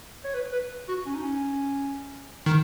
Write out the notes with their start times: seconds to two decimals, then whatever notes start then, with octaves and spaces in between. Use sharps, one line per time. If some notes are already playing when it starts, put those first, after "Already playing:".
0.25 C#5
0.34 B4
0.52 B4
0.89 F#4
1.06 C#4
1.15 D#4
1.23 C#4
2.46 D#3